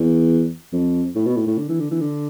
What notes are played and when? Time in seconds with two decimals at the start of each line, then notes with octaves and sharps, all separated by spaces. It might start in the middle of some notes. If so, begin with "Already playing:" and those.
Already playing: E2
0.73 F2
1.15 A2
1.26 B2
1.36 A2
1.47 A2
1.58 D3
1.69 E3
1.80 D3
1.91 E3
2.01 D3